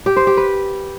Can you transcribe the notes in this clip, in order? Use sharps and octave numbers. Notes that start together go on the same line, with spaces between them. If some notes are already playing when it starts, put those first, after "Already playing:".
G4
C5
G4
B4